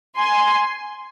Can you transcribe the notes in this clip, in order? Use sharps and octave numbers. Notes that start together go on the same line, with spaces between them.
G#5 C6